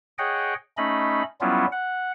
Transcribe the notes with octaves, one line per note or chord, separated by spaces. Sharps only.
G#4 C#5 D#5 F#5 G5
A3 C#4 D#4 D#5 B5
F#3 G3 B3 C#4 E4 F4
F#5